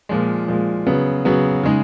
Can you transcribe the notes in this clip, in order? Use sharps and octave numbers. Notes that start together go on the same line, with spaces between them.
A#2 F3 G#3
A#2 F3 G#3
C#3 F#3 B3
C#3 F#3 B3
C#3 G#3 D#4